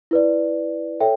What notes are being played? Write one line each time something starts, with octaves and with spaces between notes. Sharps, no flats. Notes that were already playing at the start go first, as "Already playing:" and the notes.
E4 B4 D5
A4 C#5 E5 G5